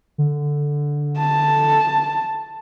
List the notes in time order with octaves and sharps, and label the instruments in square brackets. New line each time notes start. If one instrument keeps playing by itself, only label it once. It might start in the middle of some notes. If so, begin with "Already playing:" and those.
[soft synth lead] D3
[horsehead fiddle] A5